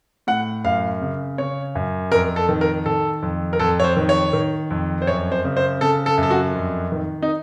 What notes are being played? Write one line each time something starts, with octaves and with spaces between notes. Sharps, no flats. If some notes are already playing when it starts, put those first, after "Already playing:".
A2 F#5
F#2 F5
C#3
C#3 C#5
F#2
F2 A#4
A4
D#3
A#4
D#3 A4
F2
A#4
F2 A4
C#5
C5
D#3
C#5
D#3
F2
C5
F#2 C#5
C5
C#3
C5
C#3 A4
A4
F#2
A4
F#4
F2
D#3
D#4